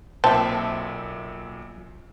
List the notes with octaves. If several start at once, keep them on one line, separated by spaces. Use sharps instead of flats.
B1 A#2 C4 E5 A5